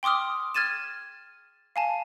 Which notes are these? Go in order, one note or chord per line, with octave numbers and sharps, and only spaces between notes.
G5 C6 D6 D#6 F6
F6 G#6 A6 D#7 E7
F5 G#5 A5